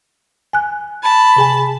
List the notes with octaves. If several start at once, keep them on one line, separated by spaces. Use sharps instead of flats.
G#5 F#6
A5 B5
C3 G#4 G#5